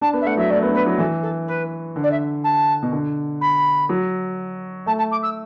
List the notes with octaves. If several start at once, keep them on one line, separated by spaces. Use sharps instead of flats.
D4 A5
B3
E5
A3 F#5
F#3 E5
A3 D5
B3
D4
B3 B4
F#3
E3 A4
A4
B4
D3
D5
E5
A5
B2
D3
B5
F#3
A3 A5
A5
D6
E6